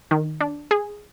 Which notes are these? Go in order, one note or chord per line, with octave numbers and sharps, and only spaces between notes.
D#3
D4
G#4